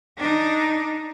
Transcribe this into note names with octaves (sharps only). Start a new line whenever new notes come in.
D4 D#4